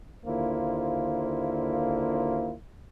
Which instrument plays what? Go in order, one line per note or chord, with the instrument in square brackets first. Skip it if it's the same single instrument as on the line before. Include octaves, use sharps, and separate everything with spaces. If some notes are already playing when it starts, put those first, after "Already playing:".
[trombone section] D#2 D3 A#3 E4 F4 C5